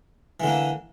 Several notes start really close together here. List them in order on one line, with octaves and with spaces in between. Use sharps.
E3 D3 A#3